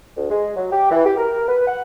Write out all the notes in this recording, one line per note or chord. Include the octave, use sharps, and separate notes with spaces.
D2
G#3
F#3
G4
E3
G4
A#4
B4
F#5